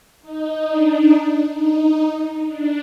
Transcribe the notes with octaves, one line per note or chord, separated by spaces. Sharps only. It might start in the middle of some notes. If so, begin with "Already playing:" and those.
D#4
D4
D#4
D4